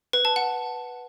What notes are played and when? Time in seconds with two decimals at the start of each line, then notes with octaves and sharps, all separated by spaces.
0.13 B4
0.25 A5
0.36 F#5